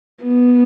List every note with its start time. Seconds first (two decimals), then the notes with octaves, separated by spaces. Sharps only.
0.23 B3